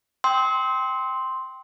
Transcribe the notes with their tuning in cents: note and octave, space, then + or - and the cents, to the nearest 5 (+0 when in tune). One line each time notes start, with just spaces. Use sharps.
G5 +0 C6 +0 E6 -40